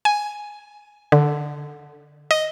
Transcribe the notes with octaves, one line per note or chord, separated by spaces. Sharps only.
G#5
D3
D#5